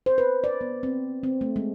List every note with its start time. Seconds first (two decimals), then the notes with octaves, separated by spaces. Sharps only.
0.06 C5
0.18 B4
0.44 D5
0.61 B3
0.83 C4
1.24 C4
1.41 A3
1.56 G#3